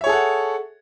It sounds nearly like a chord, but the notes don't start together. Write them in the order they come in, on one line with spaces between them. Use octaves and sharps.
E5 C#5 G#4 A4 F#5